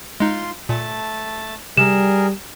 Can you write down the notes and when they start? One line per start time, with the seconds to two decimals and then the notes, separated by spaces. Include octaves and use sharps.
0.20 G#3 D#4 F4 C6
0.69 A#2 A3 A5
1.77 C3 G3 G#4 A#4 E7